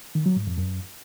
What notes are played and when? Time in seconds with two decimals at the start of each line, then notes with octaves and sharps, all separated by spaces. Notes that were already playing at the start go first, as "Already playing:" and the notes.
0.15 D#3
0.26 F#3
0.36 G#2
0.47 F2
0.58 F#2